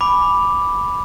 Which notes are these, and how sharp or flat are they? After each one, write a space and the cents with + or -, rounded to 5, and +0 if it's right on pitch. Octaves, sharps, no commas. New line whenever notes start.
G#5 +0 B5 +0 D6 +0